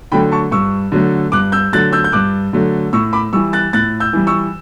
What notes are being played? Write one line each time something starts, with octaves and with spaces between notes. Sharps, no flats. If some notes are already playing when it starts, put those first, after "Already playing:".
D3 F#3 A3 G5 B5
A5 C#6
G2 C#6 E6
D3 F#3 A3
G2 D6 F#6
E6 G6
D3 F#3 A3 F#6 A6
E6 G6
G6
G2 D6 F#6
D3 F#3 A3
A2 C#6 E6
B5 D6
E3 G3 C#6 E6
F#6 A6
A2 F#6 A6
E6 G6
E3 G3
C#6 E6